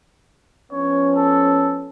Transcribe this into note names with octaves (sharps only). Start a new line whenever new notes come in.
F3 B3 C#4 C#5
A4